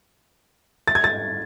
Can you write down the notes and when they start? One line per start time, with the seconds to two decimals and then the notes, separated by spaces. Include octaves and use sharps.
0.88 A6
0.95 G#6
1.04 A6